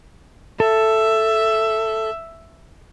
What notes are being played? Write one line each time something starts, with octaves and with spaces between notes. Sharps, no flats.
A4 E5